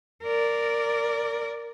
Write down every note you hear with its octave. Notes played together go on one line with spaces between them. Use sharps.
A#4 D5